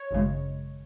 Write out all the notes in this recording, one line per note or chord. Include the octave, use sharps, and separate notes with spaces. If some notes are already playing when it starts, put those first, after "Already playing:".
Already playing: C#5
G#1 F#2 C#3 G#3